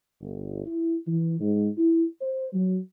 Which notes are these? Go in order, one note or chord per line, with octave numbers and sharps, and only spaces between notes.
G1
E4
E3
G#2
E4
C5
F#3